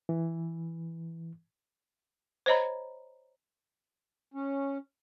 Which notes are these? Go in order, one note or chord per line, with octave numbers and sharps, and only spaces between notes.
E3
C5 C#5 D#5 A#5 B5
C#4